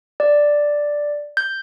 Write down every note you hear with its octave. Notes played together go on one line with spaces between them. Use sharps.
D5
G6